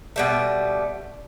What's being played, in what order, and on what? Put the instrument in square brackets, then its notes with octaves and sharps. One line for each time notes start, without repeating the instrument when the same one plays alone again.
[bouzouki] B2 G3 A3